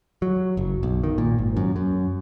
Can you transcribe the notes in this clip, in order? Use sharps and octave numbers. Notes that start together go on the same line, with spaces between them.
F#3
F#1
B1
D#3
A#2
G#1
F#2
F#2